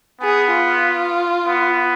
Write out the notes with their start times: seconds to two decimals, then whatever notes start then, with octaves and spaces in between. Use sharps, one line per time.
0.21 B3 G#4
0.53 F4
1.47 B3